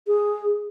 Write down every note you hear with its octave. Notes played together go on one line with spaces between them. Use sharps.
G#4